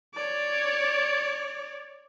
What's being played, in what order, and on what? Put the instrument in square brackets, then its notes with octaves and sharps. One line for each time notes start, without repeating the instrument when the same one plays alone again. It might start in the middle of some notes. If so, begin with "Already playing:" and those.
[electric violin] C#5 D5